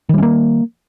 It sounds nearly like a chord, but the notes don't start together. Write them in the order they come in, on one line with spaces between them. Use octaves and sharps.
D#3 G3 C#4 A#3